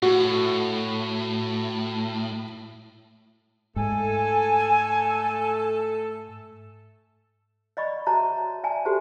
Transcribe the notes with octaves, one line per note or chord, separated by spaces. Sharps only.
A2 F#4
G#2 A3 A4 G#5
D5 D#5 B5 C#6
F#4 C#5 E5 A5 A#5
D5 E5 G#5 A5
F#4 G4 A4 C5 A5